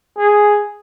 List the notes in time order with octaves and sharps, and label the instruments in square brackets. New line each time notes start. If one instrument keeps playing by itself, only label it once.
[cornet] G#4